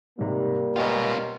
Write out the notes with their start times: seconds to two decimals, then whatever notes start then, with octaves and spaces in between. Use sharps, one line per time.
0.19 G#2 C3 G3 A#3
0.76 B2 C#4 F4 A#4 D#5 G5